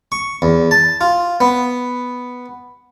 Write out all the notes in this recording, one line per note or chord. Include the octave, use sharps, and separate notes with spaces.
C#6
E2
A5
F4
B3